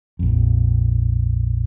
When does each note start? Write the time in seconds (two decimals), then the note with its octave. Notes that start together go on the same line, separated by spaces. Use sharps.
0.19 A#1 F2